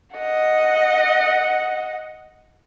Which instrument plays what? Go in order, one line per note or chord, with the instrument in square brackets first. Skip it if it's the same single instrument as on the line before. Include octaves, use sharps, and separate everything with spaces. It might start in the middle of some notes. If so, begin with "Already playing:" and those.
[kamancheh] D#5 F#5